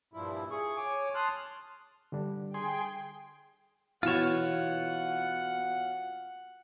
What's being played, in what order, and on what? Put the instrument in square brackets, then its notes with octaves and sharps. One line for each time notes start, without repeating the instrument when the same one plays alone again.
[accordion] G2 A#2 F3 E4
G#4 C#6
C#5 G#5 D6
A5 C6 D#6 F6 F#6
[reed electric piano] D3 G3 D4
[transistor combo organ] G#4 C6 [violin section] G5
[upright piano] B2 E3 E7 [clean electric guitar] F4 C#5 [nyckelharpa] F#5